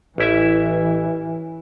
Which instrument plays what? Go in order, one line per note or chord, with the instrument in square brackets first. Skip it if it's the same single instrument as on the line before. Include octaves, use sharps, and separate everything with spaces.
[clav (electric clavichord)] A1 E4 E5 [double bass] E3